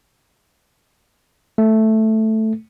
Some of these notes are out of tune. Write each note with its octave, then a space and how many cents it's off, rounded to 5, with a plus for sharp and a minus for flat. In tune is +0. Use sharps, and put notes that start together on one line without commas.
A3 +0